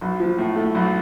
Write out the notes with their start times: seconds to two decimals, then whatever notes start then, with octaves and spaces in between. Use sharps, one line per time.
0.01 B1
0.20 F3
0.38 A2
0.56 A3
0.75 B1